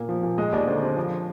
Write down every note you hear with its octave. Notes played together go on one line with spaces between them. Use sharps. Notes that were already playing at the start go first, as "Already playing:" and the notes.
Already playing: A#2 A#3
F3
A#2
G#3 D#5
D#2 D5
D3 C5
C4
F3